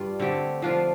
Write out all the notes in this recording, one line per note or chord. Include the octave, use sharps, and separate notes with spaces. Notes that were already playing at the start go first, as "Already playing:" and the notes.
Already playing: G2 G3 D4 F4
D3 A3 C4 G4
F3 D4 F4